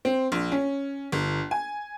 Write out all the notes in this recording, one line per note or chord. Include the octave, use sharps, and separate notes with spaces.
C4
A#1
C#4
G1
G#5